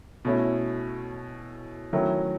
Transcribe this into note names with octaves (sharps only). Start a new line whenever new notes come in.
B2 A3 C#4 E4
D#3 F#3 A3 C#4 E4